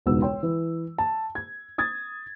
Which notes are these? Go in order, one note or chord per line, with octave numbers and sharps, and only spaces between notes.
E1 C#2 G#2 B2 B3 E6
C#5 G5 C6
E3
A5
G#6
D#6 G#6 A6